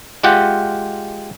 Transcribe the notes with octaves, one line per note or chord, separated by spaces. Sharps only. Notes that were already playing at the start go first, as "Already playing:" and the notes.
G#3 F4 G4 F#5